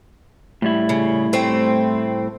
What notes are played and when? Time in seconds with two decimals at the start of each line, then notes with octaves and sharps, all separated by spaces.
0.62 A2 G3 E4
0.89 C#3
1.33 A3 C4